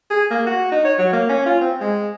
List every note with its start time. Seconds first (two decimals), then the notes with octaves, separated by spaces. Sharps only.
0.10 G#4
0.31 A#3
0.46 F#4
0.72 D#4
0.84 C#5
0.98 F#3
1.13 A#3
1.29 C#4
1.46 F4
1.61 C4
1.80 G#3